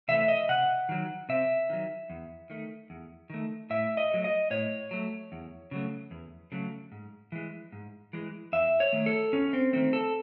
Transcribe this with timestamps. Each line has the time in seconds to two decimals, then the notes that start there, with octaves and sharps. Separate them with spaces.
0.08 C3 E3 A3 E5
0.28 D#5
0.49 C3 F#5
0.89 D#3 F#3
1.29 C3 E5
1.70 D#3 F#3
2.10 E2
2.50 D#3 A3
2.90 E2
3.30 D#3 A3
3.70 A2 E5
3.97 D#5
4.11 F#3 A3
4.24 D#5
4.50 A2 C#5
4.91 F#3 A3
5.32 E2
5.71 C#3 F#3 A3
6.11 E2
6.52 C#3 F#3 A3
6.92 G#2
7.32 E3 G#3
7.72 G#2
8.13 E3 G#3
8.52 E2 E5
8.80 C#5
8.93 D#3 A3
9.06 A4
9.33 E2 C#4
9.53 C4
9.73 D#3 A3 C4
9.93 A4